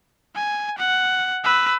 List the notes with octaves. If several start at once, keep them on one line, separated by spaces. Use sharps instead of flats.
G#5
F#5
B4 E6